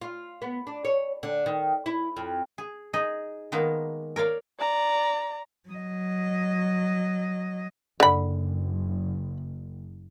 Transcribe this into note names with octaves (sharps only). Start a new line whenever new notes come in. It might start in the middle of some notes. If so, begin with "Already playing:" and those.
F4
B3
D4
C#5
D3
D#3
E4
F2
G#4
D#4 G#4 D#5
D#3 G#3 A#3 B3
A#4 C#5 D5 F5
D5 A#5
F#3 D#5
F#1 D3 B5